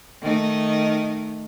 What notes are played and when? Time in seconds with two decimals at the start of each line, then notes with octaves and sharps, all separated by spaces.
0.22 D#3 A3 D#4